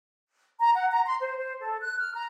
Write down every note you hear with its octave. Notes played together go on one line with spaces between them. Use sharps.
A#5
F#5
A#5
C6
C5
C5
A4
F#6
F6
A#5